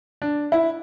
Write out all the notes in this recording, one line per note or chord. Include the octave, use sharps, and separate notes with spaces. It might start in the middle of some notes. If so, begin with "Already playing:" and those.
D4
E4